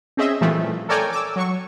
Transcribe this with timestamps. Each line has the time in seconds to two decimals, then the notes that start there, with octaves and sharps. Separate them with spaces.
0.17 C4 C#4 G#4 D#5 E5
0.41 A#2 E3 F3 G3 A3
0.89 A4 A#4 C#5 D5 G5 G#5
1.12 D6 E6
1.36 F#3 C#6